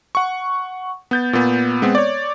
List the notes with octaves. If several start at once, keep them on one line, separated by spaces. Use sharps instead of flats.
F#5 C#6
B3 G6 A6
A#2 B3
G#3 B3 C4
C#5 D5